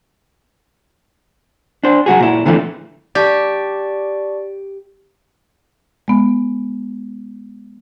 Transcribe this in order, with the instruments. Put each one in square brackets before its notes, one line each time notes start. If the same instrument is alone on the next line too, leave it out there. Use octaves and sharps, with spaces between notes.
[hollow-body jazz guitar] D4 C5
F#3 G#3 F#4 G#4
A#2 E4
A#2 D3 E3 F3 A3
[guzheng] G4 [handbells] D5 A5 C#6
[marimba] G#3 B3